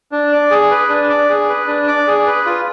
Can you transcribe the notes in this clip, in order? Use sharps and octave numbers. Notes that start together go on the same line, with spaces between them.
D4
D5
G#4
B4
D4
D5
G#4
B4
D4
D5
G#4
B4
F4